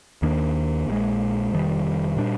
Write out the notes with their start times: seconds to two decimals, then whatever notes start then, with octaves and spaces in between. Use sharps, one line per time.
0.22 D#2 D#3 A#3 D4
0.87 A#1 A#2 G#3
1.52 F1 F2 D#3 G3
2.17 A#2 G3 D4